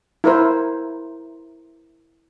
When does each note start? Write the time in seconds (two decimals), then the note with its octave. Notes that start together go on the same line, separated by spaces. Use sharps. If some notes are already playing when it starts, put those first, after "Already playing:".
0.24 E4 A#4 C5